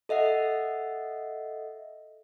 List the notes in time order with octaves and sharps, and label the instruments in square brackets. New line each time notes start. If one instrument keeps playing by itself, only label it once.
[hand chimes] A4 D#5 E5 F#5